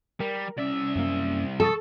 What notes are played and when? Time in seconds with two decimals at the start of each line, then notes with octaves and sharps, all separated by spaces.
0.20 G3 A#4
0.58 C2 C#4 D5 E5
0.96 F#2 A#3
1.60 A4 C#6 D#6 A6